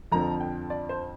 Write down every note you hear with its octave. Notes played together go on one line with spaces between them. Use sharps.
F2 D3 F3 C4 A#5
G5
D5
C5